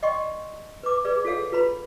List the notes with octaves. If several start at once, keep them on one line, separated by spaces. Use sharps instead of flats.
D5 D#5 F#5 G5 C6 C#6
B4 D6
G#4 B4 D5
F4 G#4 A4 C#5 F5 F#5
F4 B4 A#5 B5